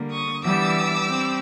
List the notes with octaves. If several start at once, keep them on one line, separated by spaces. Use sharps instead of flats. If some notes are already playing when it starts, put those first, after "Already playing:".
Already playing: D3 G3 A#3
C#6 D#6
E3 G3 B3 D4 D6 E6
G3 C4